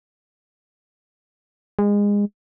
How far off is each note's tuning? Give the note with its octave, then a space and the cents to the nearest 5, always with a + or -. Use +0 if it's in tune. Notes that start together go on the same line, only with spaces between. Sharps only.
G#3 -25